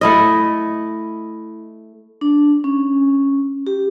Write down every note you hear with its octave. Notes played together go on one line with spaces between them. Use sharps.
A3 E4 D#5
D4
C#4
G4